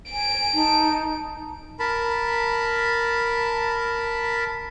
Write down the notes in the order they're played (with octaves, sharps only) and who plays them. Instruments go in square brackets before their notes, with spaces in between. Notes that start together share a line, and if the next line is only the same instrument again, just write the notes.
[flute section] G#5 [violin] D7
[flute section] D#4 A5
[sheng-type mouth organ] A#4 A5 B5